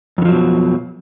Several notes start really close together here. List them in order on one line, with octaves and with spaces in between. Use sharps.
F2 D3 F3 F#3 B2